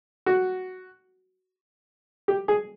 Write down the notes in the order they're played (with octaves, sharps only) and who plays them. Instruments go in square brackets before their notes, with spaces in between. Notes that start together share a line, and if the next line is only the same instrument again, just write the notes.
[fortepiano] F#4
G4
G#4